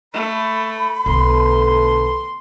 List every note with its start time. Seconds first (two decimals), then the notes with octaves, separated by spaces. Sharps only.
0.14 A3 B5
1.06 B1 D3 A3 B3 A4 C6